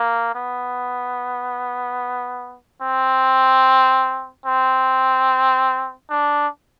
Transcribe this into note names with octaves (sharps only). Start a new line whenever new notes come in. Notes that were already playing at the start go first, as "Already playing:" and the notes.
Already playing: A#3
B3
C4
C4
D4